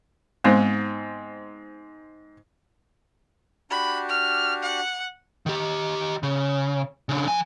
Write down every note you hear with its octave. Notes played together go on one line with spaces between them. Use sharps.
G#2 G#3 B3 C4 D#4
D4 F#4 G4 B5
F6
F#5
D#3 G4
C#3
C#3 D4
F3 G#5